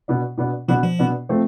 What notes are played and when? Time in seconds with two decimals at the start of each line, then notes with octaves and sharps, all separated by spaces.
0.08 B2 B3 D4
0.38 B2 B3 D4
0.68 B2 F3 B3 D4
0.83 F3
0.99 B2 B3 D4
1.29 F3 A3 C4